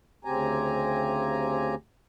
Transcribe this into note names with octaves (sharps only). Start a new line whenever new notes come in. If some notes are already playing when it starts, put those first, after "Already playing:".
D2 C#3 C4 G4 G#5 A#5